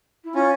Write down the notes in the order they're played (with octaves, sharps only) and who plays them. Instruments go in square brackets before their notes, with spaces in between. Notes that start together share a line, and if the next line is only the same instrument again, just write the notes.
[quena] E4
[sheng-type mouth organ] C#4 [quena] F4